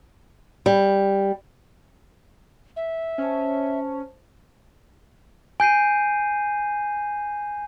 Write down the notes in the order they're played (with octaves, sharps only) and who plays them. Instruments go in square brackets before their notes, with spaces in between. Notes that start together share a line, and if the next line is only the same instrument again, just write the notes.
[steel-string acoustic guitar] G3
[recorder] E5
[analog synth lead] C#4 [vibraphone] C5 A5
[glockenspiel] G#5 G6 C7 D#7